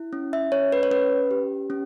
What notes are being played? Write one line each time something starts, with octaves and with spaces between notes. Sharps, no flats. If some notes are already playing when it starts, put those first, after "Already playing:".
Already playing: E4
C#4
E5
C#4 C#5
B4
C#5
C#4 B4
G4
C#4